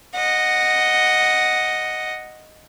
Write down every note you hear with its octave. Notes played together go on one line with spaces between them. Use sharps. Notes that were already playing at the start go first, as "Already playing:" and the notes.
D#5 F#5